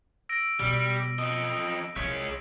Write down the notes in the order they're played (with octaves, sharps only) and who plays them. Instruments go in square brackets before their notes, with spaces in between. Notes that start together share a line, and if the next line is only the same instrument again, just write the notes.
[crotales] E6 A#6 D7
[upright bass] B2 B3 [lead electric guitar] G3
[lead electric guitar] F2 D#5
[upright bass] C2 C3 [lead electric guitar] G#3 C#5 [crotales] B6